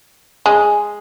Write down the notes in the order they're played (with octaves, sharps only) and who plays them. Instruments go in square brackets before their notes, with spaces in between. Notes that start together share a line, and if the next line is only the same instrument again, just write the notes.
[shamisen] G#3 [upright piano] G#4